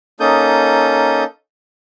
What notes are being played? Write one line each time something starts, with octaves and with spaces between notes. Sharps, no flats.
A#3 C#4 D#4 A4 D#6 G6